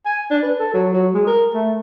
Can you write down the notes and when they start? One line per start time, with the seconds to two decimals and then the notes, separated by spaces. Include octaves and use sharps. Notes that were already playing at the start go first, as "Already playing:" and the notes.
0.06 G#5
0.31 D4
0.43 B4
0.60 A4
0.74 F#3
0.94 F#3
1.15 G#3
1.27 A#4
1.54 A3